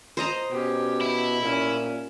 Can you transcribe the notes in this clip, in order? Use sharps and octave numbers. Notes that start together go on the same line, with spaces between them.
C5 D#5 A#5
B2 C#4 G4
E4
A#2 C#4